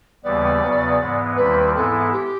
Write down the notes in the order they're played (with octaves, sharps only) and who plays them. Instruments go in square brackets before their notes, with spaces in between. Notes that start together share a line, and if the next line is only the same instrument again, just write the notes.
[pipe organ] D#2 C#3 E3 G3 B3 [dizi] D5
[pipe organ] E2 C#3 F#3 B3
G#2 E3 G#3 B3
[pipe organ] D#2 D#3 G3 C4 E4 [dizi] B4
[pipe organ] G#2 E3 G#3 B3 E4 [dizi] A4
[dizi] G4